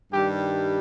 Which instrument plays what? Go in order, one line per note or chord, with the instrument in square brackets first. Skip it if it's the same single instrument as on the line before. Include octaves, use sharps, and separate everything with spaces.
[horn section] G2 D#3 G3 G4